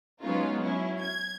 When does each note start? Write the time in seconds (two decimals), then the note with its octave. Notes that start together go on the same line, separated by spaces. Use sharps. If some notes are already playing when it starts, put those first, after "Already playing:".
0.22 F#3 G#3 B3 C#4 D#4 F4
0.59 F#3 C#4 E4
1.00 G#6